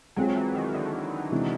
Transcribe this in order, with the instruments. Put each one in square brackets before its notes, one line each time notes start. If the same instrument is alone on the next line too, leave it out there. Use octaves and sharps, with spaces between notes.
[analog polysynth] F#3 [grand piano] G#3 C4 F4 G#4
[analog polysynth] E3
D#3
D3
[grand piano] C3 E3 G#3 C4 E4